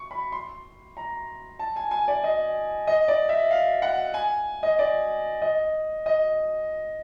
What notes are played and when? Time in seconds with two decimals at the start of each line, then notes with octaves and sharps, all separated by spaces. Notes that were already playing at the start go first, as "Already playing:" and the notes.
Already playing: C#6
0.11 B5
0.32 C6
0.97 A#5
1.59 A5
1.76 G#5
1.91 G#5
2.08 D5
2.24 D#5
2.87 D#5
3.08 D5
3.29 E5
3.51 F5
3.82 F#5
4.14 G#5
4.63 D#5
4.79 D5
5.42 D#5
6.06 D#5